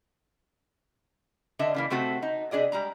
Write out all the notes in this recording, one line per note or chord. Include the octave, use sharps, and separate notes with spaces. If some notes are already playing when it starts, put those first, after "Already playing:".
D3 D4 D#5 E5
C#3 E3 A#3
C3 A3 C4 F#4 A4
D#4
C3 D4 G#4 D5 D#5
G3 G#3 A#5